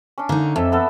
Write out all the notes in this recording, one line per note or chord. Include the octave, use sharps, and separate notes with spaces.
C#4 D4
D3 A#3 D#4
F2 A4 E5
B3 A4 B4